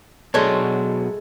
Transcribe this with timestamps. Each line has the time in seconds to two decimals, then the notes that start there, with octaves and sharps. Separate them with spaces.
0.34 B2 F#3 G#3 A3 D4 C#5 C6